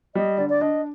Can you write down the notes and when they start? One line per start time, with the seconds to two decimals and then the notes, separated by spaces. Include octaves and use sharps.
0.15 G3 D#5
0.38 D3 D5
0.49 D5
0.61 D4 D#5